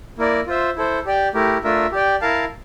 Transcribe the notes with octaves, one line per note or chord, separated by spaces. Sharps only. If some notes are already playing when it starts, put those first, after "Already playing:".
A#3 E4 A#4 D5
F4 C5 E5
E4 A4 C5
G4 D5 G5
A3 E4 G4 A#4
A3 D4 F4 A#4 E5
G4 D5 G5
E4 A#4 F5 A5